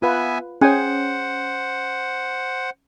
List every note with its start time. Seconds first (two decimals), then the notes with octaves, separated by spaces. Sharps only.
0.02 B3 F4 B4 E5 G#5
0.61 C#4 G#4 C5 C#5 F#5 G#5